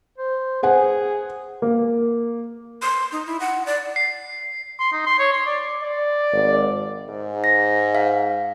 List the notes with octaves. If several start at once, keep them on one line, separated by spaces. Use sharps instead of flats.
C5
G#4 C5 F#5 G#5
A#3
C6
D#4
E4
F#5
D5
C7
C6
D#4
C6
C#5
C6
D5
D5
G#1
G#2
A#6
F5